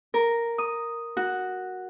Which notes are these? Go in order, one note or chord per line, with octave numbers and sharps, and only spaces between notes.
A#4
D#6
F#4